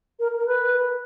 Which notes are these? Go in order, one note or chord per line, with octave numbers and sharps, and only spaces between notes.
A#4
A#4
B4